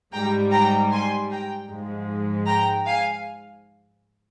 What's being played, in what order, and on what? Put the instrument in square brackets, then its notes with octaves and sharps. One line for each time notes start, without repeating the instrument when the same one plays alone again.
[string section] G#2 G3 G5 A#5
G5 A#5
G#5 C6
G5 A#5
G#2 F3 G#3
G5 A#5
F5 G#5